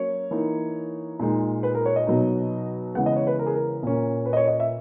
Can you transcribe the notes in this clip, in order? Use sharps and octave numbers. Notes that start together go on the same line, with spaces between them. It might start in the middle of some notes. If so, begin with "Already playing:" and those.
Already playing: F#3 A#3 C#4 C#5
E3 A#3 D#4
A#2 G#3 D#4
B4
A#4
C#5
D#5
B2 F#3 B3 D#4
C#3 E3 G#3 B3 F#5
D#5
C#5
B4
A#4
G#4
A#4
A#2 A#3 C#4
B4
D#5
C#5
D#5
E5